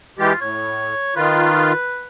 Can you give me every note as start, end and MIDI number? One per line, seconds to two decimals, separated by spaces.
0.19 0.33 52
0.19 0.33 56
0.19 0.39 65
0.19 0.33 67
0.41 0.94 45
0.41 1.13 73
1.16 1.73 51
1.16 1.73 65
1.16 2.08 71